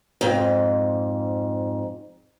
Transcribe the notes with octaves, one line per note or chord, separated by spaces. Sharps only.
F2 G#2